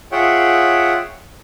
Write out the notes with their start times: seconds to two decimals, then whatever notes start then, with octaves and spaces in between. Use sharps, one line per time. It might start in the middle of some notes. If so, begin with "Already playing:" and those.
0.12 F4 G#4 C#5 E5 F#5 G5